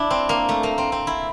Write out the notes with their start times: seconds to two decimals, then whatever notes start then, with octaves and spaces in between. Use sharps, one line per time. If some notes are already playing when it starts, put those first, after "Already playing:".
Already playing: D4 E4
0.10 C4
0.29 A#3
0.49 A3
0.63 A#3
0.78 C4
0.92 C4
1.07 E4